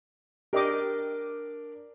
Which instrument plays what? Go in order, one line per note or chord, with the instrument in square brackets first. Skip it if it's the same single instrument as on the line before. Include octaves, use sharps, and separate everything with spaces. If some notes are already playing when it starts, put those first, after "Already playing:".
[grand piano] D4 A#4 [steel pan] G4 D#5 D6